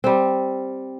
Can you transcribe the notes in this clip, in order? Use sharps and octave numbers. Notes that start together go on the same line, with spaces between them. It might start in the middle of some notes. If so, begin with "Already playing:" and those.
G3 C4